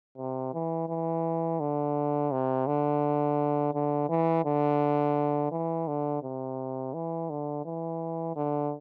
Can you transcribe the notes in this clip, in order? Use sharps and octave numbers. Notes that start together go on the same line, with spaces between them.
C3
E3
E3
D3
C3
D3
D3
E3
D3
E3
D3
C3
E3
D3
E3
D3